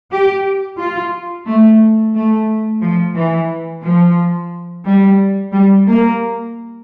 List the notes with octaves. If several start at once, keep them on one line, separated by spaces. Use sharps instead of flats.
G4
F4
A3
A3
F3
E3
F3
G3
G3
A#3